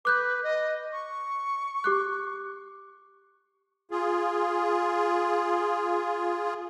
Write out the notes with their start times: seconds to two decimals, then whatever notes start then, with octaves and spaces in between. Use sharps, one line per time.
0.05 B4 D6 F#6 G6
0.43 D#5
0.92 C#6
1.84 G4 D6 F#6
3.91 F4 G#4